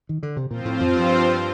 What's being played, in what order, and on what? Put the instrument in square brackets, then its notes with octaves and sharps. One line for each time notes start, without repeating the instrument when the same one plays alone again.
[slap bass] D#3
D3
C3
[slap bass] A#2 [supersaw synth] F3 C4 F4 C5
[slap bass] A2
F2
G2